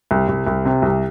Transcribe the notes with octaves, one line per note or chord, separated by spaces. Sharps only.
C2
C2
C2
C3
C2